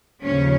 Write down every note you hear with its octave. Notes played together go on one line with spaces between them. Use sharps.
D#2 C#3 F3 C#4 C#5